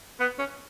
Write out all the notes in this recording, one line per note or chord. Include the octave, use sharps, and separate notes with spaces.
B3
C#4